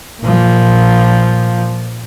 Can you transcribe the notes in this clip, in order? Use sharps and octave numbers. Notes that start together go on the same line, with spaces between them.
A#2 F3